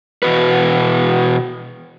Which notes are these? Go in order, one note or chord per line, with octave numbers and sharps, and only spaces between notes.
B2 E3 F#4 B4